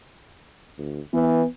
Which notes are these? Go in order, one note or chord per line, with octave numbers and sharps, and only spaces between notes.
D2
E3 B3